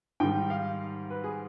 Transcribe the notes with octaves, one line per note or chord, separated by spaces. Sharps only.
G#2 D#3 G3 G5
F5
B4
G#4